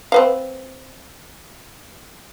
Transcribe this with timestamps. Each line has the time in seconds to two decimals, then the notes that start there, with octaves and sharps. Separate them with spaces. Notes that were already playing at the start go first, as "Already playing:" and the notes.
0.12 C4 B4 F5